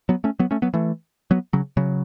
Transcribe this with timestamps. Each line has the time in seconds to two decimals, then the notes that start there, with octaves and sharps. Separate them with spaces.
0.09 F#3 B3
0.24 A3 C#4
0.39 F#3 B3
0.51 A3 C#4
0.62 F#3 B3
0.73 E3 A3
1.31 F#3 B3
1.53 C#3 F#3
1.77 C#3 F#3